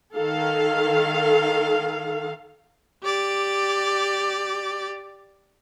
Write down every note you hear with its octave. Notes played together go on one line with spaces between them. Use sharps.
D#3 A4 F5
G4 D5